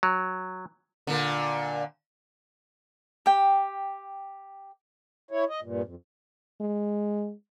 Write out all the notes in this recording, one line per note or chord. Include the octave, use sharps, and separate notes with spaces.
F#3
A#2 D3
G4 G5
E4 C#5
D#5
G2 A#2
F2
G#3